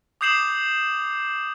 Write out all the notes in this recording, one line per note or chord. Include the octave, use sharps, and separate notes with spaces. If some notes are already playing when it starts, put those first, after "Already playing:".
D6 D#6 G6 C7 E7 F#7